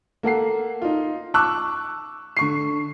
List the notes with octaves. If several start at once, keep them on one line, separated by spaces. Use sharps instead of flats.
A#3 A4 F#5 C7
D#4 F4
A5 C#6 D6 E6 F#6
D3 C#6 C7